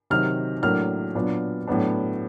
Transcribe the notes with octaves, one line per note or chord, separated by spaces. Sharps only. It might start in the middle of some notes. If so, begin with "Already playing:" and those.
C3 D#3 F#3 F6
A2 F#3 A#3 D4 F6
A#2 F#3 B3 D4
A2 F#3 B3 D4